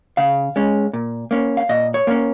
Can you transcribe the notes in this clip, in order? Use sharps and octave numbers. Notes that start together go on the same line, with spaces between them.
C#3 F5
G#3 C#4
A#2
A#3 C#4
F5
A#2 D#5
C#5
A#3 C#4